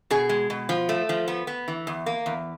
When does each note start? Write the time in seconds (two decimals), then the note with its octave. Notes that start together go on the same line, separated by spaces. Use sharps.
0.11 B2 G#4
0.29 G#3
0.50 B2
0.69 F3
0.89 A3
1.09 F3
1.28 B3
1.47 B3
1.68 E3
1.87 E2
2.06 A#3
2.26 E2